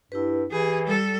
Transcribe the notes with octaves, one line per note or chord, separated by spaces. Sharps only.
G2 E4 G4 B4
E3 G4 G#4
G3 A4